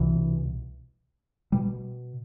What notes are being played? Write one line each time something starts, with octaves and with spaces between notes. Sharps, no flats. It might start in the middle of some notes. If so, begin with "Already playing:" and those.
Already playing: C2 B2 E3
B2 G3